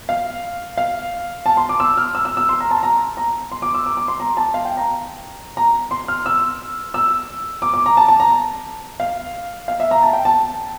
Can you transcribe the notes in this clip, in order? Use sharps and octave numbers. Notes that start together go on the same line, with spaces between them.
F5
F5
A5
C6
D6
E6
F6
E6
E6
E6
C6
A#5
A5
A#5
A#5
C6
D6
E6
D6
D6
C6
A#5
A5
F5
G5
A#5
A#5
C6
F6
E6
E6
D6
D6
A#5
A5
A5
A#5
F5
F5
E5
A#5
A5
G5
A5